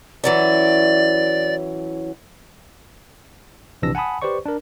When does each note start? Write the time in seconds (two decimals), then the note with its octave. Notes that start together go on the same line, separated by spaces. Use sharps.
0.24 E3 F#3 C#4 D5
3.82 A#1 C3 E3 D4 E6 A#6
3.95 F#5 G#5 A5 B5 D#6
4.22 G4 B4 C5 D5 C#6
4.45 D4 A#4